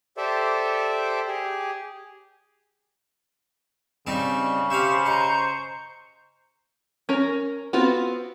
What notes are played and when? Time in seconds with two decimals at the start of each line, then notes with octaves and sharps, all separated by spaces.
0.17 G4 A4 C5 D5 E5
1.28 G4 G#4
4.07 C#3 G3 C4 D#4
4.70 G4 C5 E5 F5 C#6
5.06 D#5 A#5
7.09 C#4 A#4
7.73 B3 C4 F4 F#4